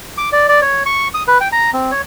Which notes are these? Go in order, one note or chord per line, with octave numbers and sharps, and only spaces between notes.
D6
D5
D5
C#5
C#6
D#6
B4
G5
A#5
C4
C#5